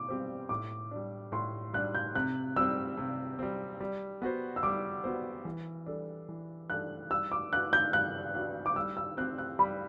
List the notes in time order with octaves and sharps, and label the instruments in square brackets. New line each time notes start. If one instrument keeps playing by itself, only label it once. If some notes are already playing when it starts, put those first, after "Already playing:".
Already playing: [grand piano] B2 [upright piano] D6
[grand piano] G3 C4 G4 C5
[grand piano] A2 [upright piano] D6
[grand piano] G3 D4
[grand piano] A2 [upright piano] C6
[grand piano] G3 D4 [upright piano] F#6
[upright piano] G6
[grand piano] C3 [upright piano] F#6
[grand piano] G3 C4 [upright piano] E6
[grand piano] C3
G3 C4
G3
B3 F#4 C5
[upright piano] E6
[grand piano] G3 [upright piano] D6
[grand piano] B3 F#4 C5
E3
G3 D4 A4
E3
[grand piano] G3 D4 A4 [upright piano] F#6
[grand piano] G3 [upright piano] E6
[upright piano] D6
[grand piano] D4 F#4 B4 [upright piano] F#6
[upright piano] G6
[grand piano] G3 [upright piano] F#6
[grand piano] D4 F#4 B4
[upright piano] D6
[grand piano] G3 [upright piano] E6
[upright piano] E6
[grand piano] C4 [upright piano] F#6
[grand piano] G4
[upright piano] F#6
[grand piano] G3 [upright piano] B5